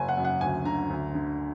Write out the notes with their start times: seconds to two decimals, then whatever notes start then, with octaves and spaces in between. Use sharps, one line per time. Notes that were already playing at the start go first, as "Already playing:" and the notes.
Already playing: F#1 G#5
0.09 F#5
0.17 F#2
0.25 F#5
0.41 D2 G#5
0.65 D3 A#5
0.89 D2
1.14 D3